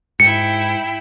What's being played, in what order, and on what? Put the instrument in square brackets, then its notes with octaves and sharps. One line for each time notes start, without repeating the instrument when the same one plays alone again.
[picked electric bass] G#2 [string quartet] E4 G5 [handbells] C#7